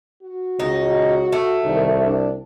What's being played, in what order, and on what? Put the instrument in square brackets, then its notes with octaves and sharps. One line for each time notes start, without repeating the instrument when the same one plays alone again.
[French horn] F#4
[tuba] C#2 [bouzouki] D#4
[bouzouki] A3
[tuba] C2 [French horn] D#3
[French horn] D4